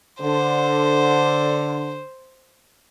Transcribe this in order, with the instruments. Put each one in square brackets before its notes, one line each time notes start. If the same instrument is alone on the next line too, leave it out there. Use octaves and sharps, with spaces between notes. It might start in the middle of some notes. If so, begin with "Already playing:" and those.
[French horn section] D3 [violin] C5